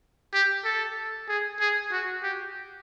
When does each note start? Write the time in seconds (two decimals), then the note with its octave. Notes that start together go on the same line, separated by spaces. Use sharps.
0.34 G4
0.65 A4
1.29 G#4
1.60 G#4
1.92 F#4
2.23 G4